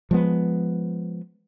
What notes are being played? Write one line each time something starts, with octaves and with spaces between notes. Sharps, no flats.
F3 G#3 B3